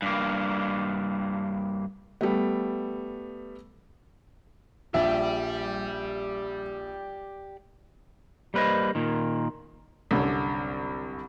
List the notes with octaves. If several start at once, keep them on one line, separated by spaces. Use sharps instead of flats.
G2 A#3
G3 A3 B3
A#1 G4 D5 E5
G3 A#3 B4 C5 D#5
A#2 D#3
C2 F#2 D3